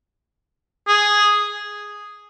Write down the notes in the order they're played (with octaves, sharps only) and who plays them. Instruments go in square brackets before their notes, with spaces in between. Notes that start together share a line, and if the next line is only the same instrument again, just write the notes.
[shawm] G#4